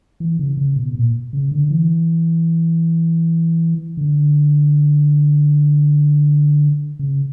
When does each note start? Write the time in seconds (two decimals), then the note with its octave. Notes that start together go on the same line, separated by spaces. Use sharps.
0.20 E3
0.39 C#3
0.57 C#3
0.76 B2
0.95 A#2
1.33 C#3
1.51 D3
1.71 E3
3.97 D3
6.99 C#3